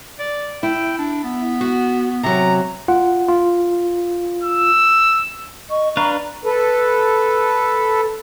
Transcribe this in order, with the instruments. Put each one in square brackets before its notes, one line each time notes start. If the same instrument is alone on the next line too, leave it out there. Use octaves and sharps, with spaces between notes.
[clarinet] D5
[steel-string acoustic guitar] E4 [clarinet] G5
[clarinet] D4
B3
[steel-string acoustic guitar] F#4
[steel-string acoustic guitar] C3 F#3 [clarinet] A#5
[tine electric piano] F4 F#5
F4
[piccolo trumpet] E6
[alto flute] D#5 [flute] C#6
[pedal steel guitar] D4 B4 F5 [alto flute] A#5
[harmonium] A4 B4